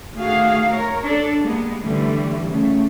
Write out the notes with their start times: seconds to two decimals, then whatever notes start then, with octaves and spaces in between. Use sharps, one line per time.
0.16 D#3 A3 F#4 G#4 F5
0.71 A#4 C#5
1.03 D4 A4
1.42 G3 G#3 A#3 B3
1.81 D3 E3 G3 A3
2.47 C#3 A3